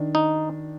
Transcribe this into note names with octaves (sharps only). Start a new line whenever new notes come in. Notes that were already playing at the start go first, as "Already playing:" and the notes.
Already playing: D#3 D4
D#4